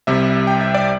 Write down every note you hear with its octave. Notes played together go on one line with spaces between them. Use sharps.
C2 C3 G3 E5
G5
E5
D5